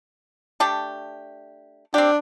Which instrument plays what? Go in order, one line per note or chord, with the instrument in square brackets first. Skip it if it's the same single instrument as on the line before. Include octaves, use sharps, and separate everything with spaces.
[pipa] A3 D4 G4
[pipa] C4 G4 [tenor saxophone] D4